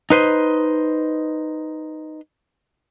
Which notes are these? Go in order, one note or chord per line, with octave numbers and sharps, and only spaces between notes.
D#4 B4 C5 D#5